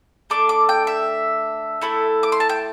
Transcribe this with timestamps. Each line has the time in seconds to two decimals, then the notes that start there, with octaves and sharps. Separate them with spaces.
0.30 A3 D4 A4 D6
0.49 D6
0.69 G5
0.87 E5
1.82 A3 E4 A4
2.23 D6
2.32 C6
2.40 A5
2.49 G5